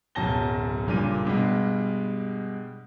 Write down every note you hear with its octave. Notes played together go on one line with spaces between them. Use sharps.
D1 F#2 B2 A5 A#6 G7
F#1 G2 A#2 D#7
G2 B2 G3 G#3